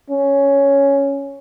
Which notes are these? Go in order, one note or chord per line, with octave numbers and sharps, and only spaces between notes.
C#4